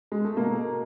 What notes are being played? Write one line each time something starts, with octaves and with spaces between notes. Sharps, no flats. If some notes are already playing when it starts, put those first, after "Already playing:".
G#3
A3
B2 A#3